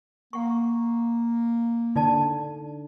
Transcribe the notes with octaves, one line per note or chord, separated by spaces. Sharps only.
A#3 F#5 C#6
D3 D#4 D5 A5